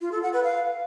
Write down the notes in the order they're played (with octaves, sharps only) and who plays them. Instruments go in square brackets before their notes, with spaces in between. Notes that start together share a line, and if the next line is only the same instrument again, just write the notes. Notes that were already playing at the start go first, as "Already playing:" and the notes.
[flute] F4
A4
F#5
B4
F5